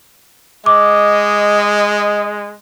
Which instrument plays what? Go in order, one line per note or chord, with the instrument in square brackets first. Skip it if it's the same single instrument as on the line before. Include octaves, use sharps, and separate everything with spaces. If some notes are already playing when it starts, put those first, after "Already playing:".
[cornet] G#3 [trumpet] D#5 [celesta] D6